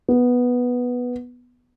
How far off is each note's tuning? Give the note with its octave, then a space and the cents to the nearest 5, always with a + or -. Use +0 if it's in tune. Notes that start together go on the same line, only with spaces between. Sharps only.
B3 -5